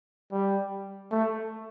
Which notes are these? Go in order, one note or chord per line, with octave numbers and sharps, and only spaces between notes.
G3
A3